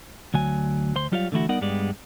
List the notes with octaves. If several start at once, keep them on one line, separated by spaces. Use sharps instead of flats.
D2 F#3 G#5
D2 C5 C6
F#3 G3 F4 C#5 E5 F5
D3 E3 A3 E4 F#4
G3 B3 D#4 A#4 D5 F#5
G2 G3 G#3 B3 D5